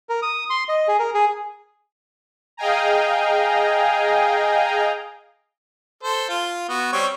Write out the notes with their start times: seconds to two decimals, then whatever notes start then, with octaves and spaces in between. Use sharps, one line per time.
0.09 A#4
0.22 D#6
0.50 C6
0.69 D#5
0.88 G#4
0.99 A#4
1.14 G#4
2.57 G#4 D#5 F5 G5 G#5 A#5
6.03 A4 C5
6.29 F4
6.69 B3 F#4
6.93 G3 C4 C#5